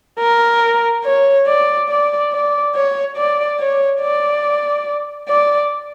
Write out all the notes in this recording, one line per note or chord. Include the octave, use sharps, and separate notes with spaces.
A#4
C#5
D5
D5
D5
C#5
D5
C#5
D5
D5